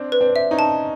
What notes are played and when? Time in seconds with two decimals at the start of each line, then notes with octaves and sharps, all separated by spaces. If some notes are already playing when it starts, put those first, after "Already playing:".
Already playing: C4 D4
0.12 B4
0.21 C4 D4
0.36 E5
0.51 C#4 D#4
0.59 A5